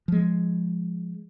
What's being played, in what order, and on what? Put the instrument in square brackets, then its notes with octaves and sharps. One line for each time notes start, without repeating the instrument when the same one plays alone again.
[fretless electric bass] F3 G#3